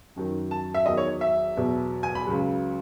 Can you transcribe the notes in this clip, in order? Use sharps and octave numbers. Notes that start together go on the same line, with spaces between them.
F#2 D#3 F#3
A5
E5
E2 D#3 F#3 D#5
C#5
E5
E2 B2 F#3
G#5
B5
C#2 C#3 F#3